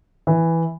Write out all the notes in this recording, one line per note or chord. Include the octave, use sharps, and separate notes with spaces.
E3